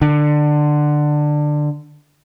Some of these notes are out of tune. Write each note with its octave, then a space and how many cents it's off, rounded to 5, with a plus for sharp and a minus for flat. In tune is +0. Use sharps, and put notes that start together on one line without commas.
D3 +15